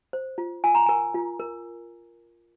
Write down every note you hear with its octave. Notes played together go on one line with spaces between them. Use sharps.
C5
F4
F4 G#5
A#5
A#4 G#5
F4
A#4